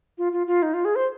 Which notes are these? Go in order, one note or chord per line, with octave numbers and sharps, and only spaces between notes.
F4
F4
F4
D#4
F4
G#4
C5